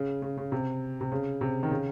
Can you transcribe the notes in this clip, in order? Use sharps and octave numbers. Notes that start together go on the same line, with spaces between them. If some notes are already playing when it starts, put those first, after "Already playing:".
Already playing: C#3
C#3
C#3
C3
C3
C#3
C3
D#3
C#3